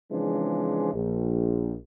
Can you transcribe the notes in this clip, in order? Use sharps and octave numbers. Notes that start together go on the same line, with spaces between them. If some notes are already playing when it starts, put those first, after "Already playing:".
C#3 E3 F3 G#3 C4 D4
A#1